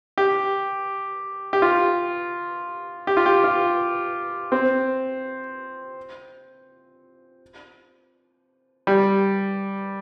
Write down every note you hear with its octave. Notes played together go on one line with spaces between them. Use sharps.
G4
G4
F4
G4
F4
G4
F4
C4
G3